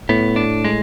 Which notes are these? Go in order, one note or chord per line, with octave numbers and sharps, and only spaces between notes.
A2 B3
D4
G#3